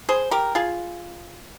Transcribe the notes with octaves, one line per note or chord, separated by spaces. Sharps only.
G#4 C5
G4 A#4
F4 G#4